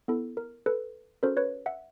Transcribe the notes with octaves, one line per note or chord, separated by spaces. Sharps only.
B3 E4 A4
A#4
A4 B4
C#4 F#4 A4 A#4 C5
B4 C#5
E5 F#5